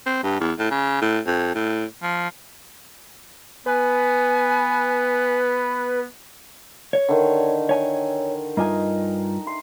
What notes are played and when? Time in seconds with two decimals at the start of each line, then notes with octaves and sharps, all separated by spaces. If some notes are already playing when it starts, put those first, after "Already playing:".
0.06 C4
0.24 G2
0.40 E2
0.59 A2
0.71 C#3
1.02 A2
1.26 F2
1.55 A2
2.03 F3
3.66 B3 B4 G#5
6.93 C#5
7.09 D3 D#3
7.69 C#5 G#5
8.57 G2 D#4 F4 G#5
9.47 C6